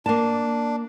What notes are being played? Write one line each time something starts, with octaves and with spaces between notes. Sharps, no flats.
A#3 D4 A5